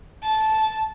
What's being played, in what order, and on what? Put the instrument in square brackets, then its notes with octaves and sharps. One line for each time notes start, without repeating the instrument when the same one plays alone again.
[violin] A5